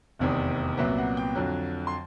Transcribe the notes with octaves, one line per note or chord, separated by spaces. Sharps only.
F1 E2 C3 D#3
C2 A#2 F#3 B3 E5
F#5
G5
F2 D3 F#3
C6